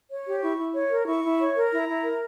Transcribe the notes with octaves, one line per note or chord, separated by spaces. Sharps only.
C#5
G4
E4 C#6
E4
C#5
A#4
E4 C#6
E4
C#5
A#4
E4 A#5
E4
A#4